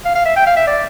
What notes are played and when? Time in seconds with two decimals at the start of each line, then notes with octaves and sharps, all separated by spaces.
0.05 F5
0.15 F5
0.25 E5
0.36 G5
0.46 F5
0.56 E5
0.67 D5